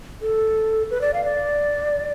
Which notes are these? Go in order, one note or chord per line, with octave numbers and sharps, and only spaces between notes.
A4
B4
D5
F5
D5